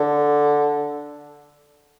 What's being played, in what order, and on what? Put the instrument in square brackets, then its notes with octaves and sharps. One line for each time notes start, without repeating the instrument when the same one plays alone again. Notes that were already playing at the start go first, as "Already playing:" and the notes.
Already playing: [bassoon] D3